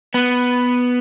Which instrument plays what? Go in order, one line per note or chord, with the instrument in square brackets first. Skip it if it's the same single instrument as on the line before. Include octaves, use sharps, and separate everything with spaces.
[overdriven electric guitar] B3